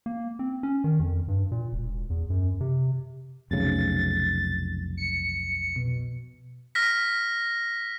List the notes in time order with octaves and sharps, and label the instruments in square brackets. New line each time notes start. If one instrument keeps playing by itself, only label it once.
[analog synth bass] A#3
C4
C#4
D#3
F2
G2
A#2
E1
E2
F#2
C3
[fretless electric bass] F1 B1 C#3 [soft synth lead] A6
[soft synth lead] C#7
B2
[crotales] F6 A#6 B6